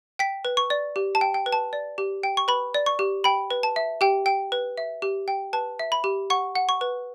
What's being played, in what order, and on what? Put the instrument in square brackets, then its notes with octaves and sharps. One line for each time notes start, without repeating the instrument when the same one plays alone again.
[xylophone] G5 B6
B4
C#6
D5
G4
A5
G5
G5
B4
A5
D5
G4
G5
C#6
B4 B5
D5
C#6
G4
G5 B5
B4
A5
E5
G4 G5
G5
B4
E5
G4
G5
B4 A5
E5
B5
G4
F#5 C#6
F#5
C#6
B4